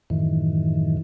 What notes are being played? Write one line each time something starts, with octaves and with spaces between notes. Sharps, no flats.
F#2 A2 D#3 E3